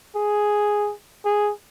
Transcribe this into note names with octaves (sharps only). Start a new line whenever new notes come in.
G#4
G#4